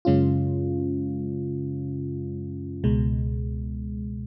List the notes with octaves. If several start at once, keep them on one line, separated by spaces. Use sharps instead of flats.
F#2 C#3 G#3 C#4 F4
C#2 B2 G#3